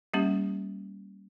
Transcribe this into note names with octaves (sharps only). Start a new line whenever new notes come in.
G3 A#3 C#4 G4